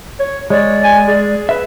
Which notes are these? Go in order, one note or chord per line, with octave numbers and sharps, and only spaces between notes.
C#5
G#3 C#5 D5
G#5
G#4
B4 E5